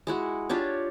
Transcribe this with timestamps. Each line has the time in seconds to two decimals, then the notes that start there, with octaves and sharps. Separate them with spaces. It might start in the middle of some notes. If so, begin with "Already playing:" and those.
0.07 G#3 E4 F#4
0.49 D4 F4 G4 C#5